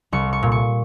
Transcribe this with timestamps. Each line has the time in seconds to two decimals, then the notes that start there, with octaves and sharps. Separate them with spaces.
0.12 C2 C#6
0.33 C#6
0.43 A#2
0.52 C#6